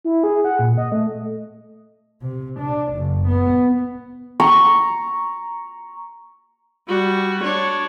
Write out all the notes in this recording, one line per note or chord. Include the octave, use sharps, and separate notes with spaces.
E4
G#4
F#5
A#2
D#5
A3
C3
D4
F#1
B3
A#5 C#6
G3 F#4
D4 C#5